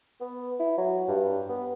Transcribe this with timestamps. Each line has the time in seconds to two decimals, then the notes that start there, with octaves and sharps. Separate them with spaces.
0.20 B3
0.60 E4
0.78 F#3
1.08 G2
1.49 B3